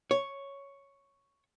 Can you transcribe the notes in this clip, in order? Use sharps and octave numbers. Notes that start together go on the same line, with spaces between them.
C#5